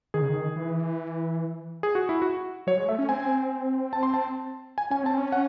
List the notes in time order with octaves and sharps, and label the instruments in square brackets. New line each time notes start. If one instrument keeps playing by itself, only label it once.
[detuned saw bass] D#3 [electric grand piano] G#4
[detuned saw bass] C#3
D#3
E3
[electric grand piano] G#4
F#4
E4
F#4
[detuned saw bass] F#3 [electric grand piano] C#5
[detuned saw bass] G#3
[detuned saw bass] A3 [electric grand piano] E5
[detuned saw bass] C#4
[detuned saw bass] C4 [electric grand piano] G#5
[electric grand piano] A5
C6
A5
G#5
[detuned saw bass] C#4 [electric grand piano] G#5
[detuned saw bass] C4 [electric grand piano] A5
[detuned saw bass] C#4
[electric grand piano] F#5